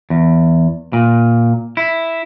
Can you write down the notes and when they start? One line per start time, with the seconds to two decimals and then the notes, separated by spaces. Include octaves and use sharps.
0.10 E2
0.93 A#2
1.77 E4